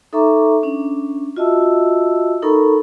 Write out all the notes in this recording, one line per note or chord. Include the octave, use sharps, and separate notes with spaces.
D#4 A4 E5 A#5 C#6 D6
C#4 D4
F4 F#4 D#5 E5 A5 E6
D#4 A4 A#4 A#5 B5 C#6